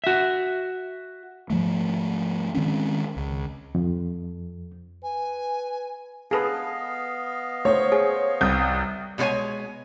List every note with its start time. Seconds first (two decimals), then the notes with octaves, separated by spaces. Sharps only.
0.04 F#4 E5
1.50 G#2 F3 G3 A3
2.54 D#3 G#3 C4 C#4
3.17 C#2
3.75 F2
5.03 B4 G#5
6.31 B3 G#4 A4 B4 D#5 F5
7.65 A3 C5 C#5
7.92 G#4
8.41 C2 D#6 G6
9.18 B2 G3 G#3 C#5 G#5